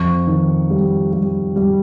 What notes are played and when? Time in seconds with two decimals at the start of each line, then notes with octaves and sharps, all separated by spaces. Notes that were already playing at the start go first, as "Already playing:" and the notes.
Already playing: F2 C#6
0.27 D#3
0.70 G3
1.13 G3
1.56 G3